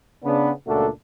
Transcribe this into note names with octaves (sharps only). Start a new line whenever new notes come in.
C#3 B3 D4
C#2 A#2 A3 D4 F#4 A4